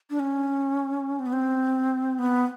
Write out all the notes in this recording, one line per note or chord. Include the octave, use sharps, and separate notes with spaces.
D4
C#4
C4
B3
C4
B3